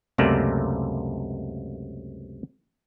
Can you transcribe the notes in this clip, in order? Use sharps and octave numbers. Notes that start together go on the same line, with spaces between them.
C#2 F#2 C3 A3 A#3 D5